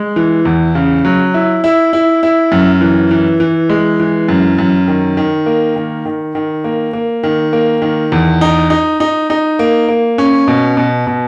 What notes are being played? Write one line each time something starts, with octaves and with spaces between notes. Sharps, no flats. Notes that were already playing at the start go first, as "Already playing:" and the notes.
Already playing: G#3
E3
E2
C#3
F#3
E4
E4
E4
E4
F#2
E3
E3
E3
G#3
E3
F#2
F#2
D#3
D#3
A#3
D#3
D#3
D#3
A#3
A#3
D#3
A#3
D#3
E2
D#4
D#4
D#4
D#4
A#3
A#3
C#4
B2
B2
B2